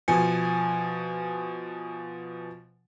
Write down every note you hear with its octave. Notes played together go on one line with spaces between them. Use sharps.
B2 F3 G#5 C#7